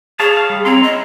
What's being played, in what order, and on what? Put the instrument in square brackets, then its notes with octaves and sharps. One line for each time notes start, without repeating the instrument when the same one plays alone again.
[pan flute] G#4 [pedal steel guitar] C#5 F5 A5
[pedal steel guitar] F5
G3
[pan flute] C4 [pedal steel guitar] C#5 A#5 C6
[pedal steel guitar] E4 [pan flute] D#5